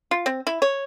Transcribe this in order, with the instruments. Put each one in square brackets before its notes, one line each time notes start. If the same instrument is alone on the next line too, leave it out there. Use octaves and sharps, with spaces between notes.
[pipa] F4
C4
E4
C#5